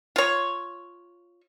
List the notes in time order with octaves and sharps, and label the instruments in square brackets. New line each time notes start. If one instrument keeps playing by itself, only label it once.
[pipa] F4 C#5